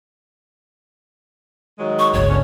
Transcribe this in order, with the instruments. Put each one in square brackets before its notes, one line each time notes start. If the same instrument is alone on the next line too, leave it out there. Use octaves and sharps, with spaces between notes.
[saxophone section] D#3 F#3 G#3
[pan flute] C#6
[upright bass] G1 C#2 [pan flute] C#5
[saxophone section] D3 B3 C#4